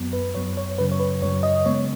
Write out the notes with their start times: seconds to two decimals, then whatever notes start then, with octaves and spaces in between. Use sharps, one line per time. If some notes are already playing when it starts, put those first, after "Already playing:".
Already playing: F#2 F#3 B3
0.13 B4
0.35 F#2 F#3 B3 C#5
0.57 C#5
0.78 F#2 C#3 F#3 B4
0.92 C#5
1.00 B4
1.22 F#2 C#3 F#3 C#5
1.43 D#5
1.65 C#3 G#3 B3 C#5